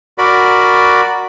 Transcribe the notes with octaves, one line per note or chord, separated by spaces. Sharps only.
F#4 A#4 D5 B5